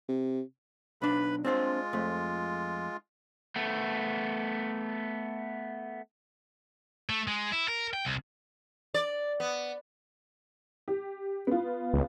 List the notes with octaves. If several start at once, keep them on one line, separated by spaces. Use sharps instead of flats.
C3
B1 D4 B4 B5
G#3 C4 D4 F4 C5
F2 A3
A3 B3
A3
G#3
E4
A#4
G5
C2
D5
B3
G4
B3 F4
C#2